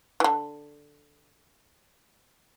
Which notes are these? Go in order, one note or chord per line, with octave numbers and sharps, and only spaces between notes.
D3 E3